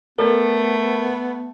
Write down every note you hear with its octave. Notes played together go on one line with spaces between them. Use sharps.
A3 B3 A4 A#4 D5